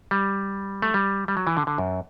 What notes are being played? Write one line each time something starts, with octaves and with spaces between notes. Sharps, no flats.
G3
A3
G3
G3
F#3
E3
D3
D3
F#2